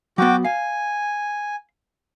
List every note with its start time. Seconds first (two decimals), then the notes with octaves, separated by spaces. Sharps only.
0.18 F#3 B3 F#4 G5 D6
0.45 F5 G#5